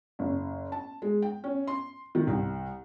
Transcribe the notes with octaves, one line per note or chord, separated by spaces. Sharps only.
F#1
A5
G#3
G5
C#4
C6
D#3
C2